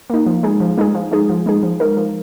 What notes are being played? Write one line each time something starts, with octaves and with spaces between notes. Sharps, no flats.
A#3 D#4
F3
G#3 D#4 G#4
F3
G#3 D#4 G#4
F3
G#3 D#4 G#4
F3
G#3 D#4 G#4
F3
G#3 D#4 A#4
F3